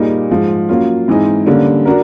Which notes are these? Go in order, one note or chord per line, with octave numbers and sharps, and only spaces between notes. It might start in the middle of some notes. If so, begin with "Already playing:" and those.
Already playing: A#2 G3 A#3 D#4 G#4
G#2 F3 G#3
F#3 A#3 C#4 F4
G#2 E3 G#3 C4 D#4
D3 G3 A#3 C#4
D4 F#4 A#4